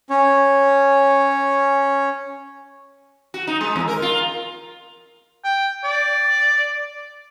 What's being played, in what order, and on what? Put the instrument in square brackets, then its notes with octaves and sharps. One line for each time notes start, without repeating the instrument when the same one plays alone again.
[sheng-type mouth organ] C#4 C#5
[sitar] F#4
D#4
G#3
E2
A#4
F4
[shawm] G5
D5